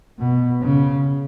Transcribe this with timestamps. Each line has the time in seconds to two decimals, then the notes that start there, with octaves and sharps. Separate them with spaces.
0.19 B2
0.62 C#3